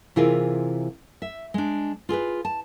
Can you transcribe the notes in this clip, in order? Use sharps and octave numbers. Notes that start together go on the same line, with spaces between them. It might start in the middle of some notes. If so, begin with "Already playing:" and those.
C3 E3 E4 F4 G#4 A#4
E5
G#3 D4
F4 G#4 A#4 B4
A5